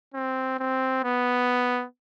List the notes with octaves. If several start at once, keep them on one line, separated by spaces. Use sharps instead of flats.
C4
C4
B3